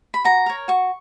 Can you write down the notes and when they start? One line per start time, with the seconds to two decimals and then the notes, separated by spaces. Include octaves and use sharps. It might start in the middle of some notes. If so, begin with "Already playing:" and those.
0.14 B5
0.24 F#4 A#5
0.46 A#4 C#5
0.68 F#4 C#6